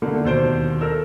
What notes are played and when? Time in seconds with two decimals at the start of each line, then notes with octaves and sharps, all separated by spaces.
0.02 D3 A3 A#3
0.25 D#2 B2 C5 G6 D7
0.81 A4 A#4 E6